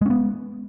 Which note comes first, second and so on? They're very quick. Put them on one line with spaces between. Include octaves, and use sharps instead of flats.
G#3 C#4 B3